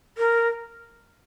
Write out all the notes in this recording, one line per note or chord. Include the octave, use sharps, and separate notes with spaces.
A#4